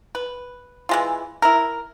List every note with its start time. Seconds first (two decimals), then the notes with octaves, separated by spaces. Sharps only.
0.15 B4
0.89 E3 G#3 F4
1.42 E4 A#4